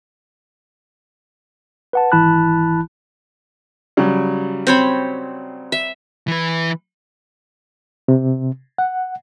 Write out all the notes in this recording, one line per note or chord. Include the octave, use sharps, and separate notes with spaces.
B4 F#5 A5
G#1 E3 E4 A5 B5 F#6
C#3 F#3 G3
C4 C#5 B5
E5
E3 B4
C3
F#5